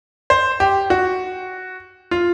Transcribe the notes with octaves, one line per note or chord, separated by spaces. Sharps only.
C5
G4
F#4
F4